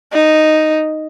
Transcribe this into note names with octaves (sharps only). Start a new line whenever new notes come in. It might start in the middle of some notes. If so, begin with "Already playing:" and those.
D#4